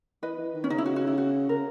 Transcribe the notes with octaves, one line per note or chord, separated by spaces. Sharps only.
E3 B4 D#5
E3
D#3
C#4
C#3 D#4
E4
F#4
F#4
E4
F#4
C#3 A#4